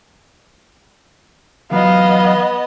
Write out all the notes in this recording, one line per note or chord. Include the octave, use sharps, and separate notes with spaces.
E3 F#3 B3 D#5 F5